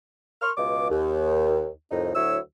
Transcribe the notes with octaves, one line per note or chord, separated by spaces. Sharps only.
A#4 C6 C#6 F6
C#2 B2 G#3 F4 D6
D#2
C2 F2 A2 D#4
D2 F#3 E4 C#5 E6